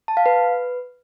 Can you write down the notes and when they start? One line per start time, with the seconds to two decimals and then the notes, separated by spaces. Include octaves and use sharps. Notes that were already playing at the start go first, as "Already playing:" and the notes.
0.08 A5
0.17 F5
0.26 B4